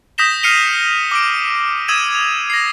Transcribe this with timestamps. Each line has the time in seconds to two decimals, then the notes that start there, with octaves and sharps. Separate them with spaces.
0.18 D#6 G6 A#6 B6 E7 G7
0.43 F6 C7 C#7 D#7 F7 G7
1.11 D6 E6 D7
1.88 D#6 E6 G#6 D#7 E7
2.15 F7
2.50 A#6 C7